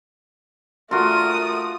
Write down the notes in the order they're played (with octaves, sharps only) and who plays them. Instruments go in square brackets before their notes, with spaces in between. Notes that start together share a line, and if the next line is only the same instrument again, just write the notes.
[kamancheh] A3 D#6 [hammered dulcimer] F4 F#4 [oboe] A#4